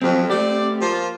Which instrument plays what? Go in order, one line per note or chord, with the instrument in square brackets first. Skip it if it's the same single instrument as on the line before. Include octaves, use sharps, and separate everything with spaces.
[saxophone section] F2 [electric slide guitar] F3 F#3 C4
[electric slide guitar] A3 G4 [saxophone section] C4 D5
[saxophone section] F3 A#3 F4